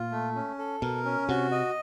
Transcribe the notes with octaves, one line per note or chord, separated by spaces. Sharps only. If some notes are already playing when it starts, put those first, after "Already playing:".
Already playing: A#2 F4
A3
C#4
A4
B2 A#4
C#4
C3 F#4
D#5